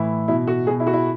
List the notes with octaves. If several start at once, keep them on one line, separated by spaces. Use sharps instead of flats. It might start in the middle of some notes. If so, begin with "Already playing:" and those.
Already playing: A2 E3 E4
B2 E4
F#4
B2 G#4
E4
F#4
E4